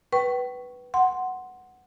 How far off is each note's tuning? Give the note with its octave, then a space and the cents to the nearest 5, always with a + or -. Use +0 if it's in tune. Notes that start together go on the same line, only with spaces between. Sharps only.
B4 +0 G5 -40 C#6 +0
F#5 +0 C6 +0